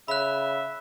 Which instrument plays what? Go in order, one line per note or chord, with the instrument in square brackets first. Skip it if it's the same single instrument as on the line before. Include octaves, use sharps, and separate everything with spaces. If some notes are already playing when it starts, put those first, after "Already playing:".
[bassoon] C#3 [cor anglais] E5 [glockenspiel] B5 F#6